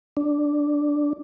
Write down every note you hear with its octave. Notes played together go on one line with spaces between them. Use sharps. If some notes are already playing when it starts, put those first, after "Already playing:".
D4